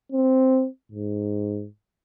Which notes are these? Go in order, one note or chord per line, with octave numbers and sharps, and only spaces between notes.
C4
G#2